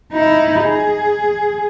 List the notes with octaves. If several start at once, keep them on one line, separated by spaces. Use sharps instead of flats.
D#4 E4
G#4